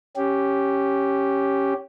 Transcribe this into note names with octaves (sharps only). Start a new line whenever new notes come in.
C#4 G4